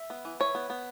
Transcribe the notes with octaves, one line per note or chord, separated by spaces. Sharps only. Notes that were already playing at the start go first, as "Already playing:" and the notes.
Already playing: E5
B3
E3
E3 C#5
B3
B3